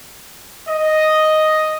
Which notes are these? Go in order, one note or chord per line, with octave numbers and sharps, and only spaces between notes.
D#5